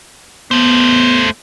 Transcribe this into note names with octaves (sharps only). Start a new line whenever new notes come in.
A3 B3 C5